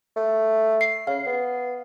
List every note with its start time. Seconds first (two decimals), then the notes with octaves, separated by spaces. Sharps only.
0.16 A3
0.81 C7
1.07 C#3 F5
1.27 B3